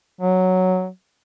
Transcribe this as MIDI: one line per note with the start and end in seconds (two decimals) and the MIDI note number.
0.21 0.88 54